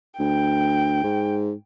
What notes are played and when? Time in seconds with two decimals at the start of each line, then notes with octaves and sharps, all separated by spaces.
0.20 D2 G5
1.04 G#2